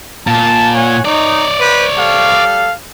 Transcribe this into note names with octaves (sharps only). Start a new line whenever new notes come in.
A#2 A5
C#5 F#5 G#5
D#4 C#5 D5
B4 C5
G3 A4 F5